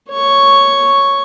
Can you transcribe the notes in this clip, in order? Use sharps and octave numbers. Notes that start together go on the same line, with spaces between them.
C#5 C#6